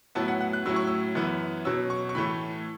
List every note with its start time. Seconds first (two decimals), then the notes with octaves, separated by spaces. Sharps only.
0.15 A2 F#3 B3 E4 A5
0.28 F#5
0.41 F#5
0.53 F#6
0.65 A2 F#3 C#4 E4 E6
0.76 C#6
0.87 E6
1.15 F#2 E3 B3 E4
1.65 B2 F#3 C#4 E6
1.90 C#6
2.09 C#6
2.15 A2 E3 A3 B5